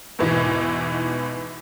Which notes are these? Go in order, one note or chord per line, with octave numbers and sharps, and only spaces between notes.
E2 G#2 B2 E3